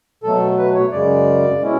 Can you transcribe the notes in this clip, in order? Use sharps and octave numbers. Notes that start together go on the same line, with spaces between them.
B2 F#3 A3 A4
B4
C#5
F#2 C#3 G#3 D5
B2 G#3 C#4 E4